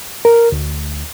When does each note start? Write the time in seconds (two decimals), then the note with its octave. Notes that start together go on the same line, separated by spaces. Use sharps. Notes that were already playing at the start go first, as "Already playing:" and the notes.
0.25 A#4
0.52 D2